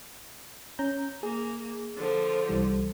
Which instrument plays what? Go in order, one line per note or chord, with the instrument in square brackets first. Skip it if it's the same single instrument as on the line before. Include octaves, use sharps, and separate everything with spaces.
[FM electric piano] C#4 A#5 G6
[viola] A#3 [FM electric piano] G#4
[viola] D3 F3
[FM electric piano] C2 E3 G3